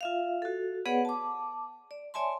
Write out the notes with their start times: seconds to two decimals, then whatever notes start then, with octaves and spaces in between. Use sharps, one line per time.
0.01 F4 E5 F5
0.42 F#4 A4
0.86 B3 G#4 B4 C#5 D5 F#5
1.05 A5 D6
1.91 D5
2.14 C#5 D5 E5 G#5 A5 C6